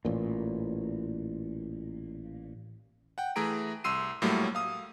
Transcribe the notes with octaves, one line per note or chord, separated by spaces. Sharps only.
A1 A#2
F#5 G5
E3 A3 G#4 A#5 D7
C2 C6 E6 C7 D#7
A#1 A2 F#3 G3 A3 A#3
F5 D#6